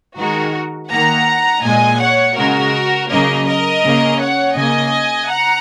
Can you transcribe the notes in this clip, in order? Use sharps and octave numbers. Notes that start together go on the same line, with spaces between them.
D#3 G#3 F#4 A#4
D#3 A#3 F#5 A#5
A#2 G#3 D#5 G#5
C#5 F#5
C#3 G#3 F#4 A#4
C#3 F#3 A#3 A#4 D#5
A#4 D#5
C#3 A#3
C#5 F#5
C#3 A#3 D#5 G#5
F#5 A#5